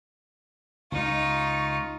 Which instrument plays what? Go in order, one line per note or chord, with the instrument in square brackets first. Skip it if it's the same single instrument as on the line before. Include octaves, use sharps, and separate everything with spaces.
[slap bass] C#2 [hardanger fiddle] D#4 F4 [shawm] C#6